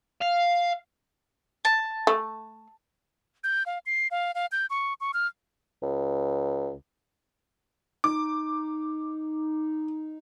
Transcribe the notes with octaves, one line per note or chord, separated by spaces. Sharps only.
F5
A5
A3
G6
F5
C7
F5
F5
G6
C#6
C#6
F6
C#2
D#4 D6